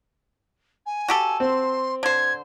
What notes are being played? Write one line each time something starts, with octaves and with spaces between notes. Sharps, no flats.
G#5
F#4 G4 A4
C4 C6
D3 C5 G#6